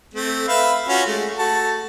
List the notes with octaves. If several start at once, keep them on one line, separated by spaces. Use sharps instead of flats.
A3 C4
B4 E5 F5
C#4 F4 F#4
G#3 A3
A3 F#4 A5